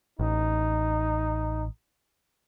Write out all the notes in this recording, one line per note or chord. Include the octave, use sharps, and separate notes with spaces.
A1 D#4